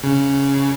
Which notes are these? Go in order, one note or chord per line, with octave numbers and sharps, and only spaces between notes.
C#3